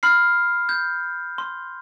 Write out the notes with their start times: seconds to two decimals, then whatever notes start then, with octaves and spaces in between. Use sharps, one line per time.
0.03 B5 F6 C7
0.69 G6
1.38 C6